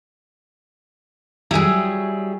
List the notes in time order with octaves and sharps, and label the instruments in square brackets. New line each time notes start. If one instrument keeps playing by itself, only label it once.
[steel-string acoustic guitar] F#3 G3 [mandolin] E4 G#4